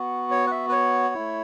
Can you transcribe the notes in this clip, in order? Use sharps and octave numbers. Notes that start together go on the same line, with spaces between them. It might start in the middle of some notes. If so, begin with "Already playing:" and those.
Already playing: B3 F#4
C#5
F#5
E5
B4
C#5
A3 E4